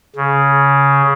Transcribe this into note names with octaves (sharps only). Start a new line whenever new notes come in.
C#3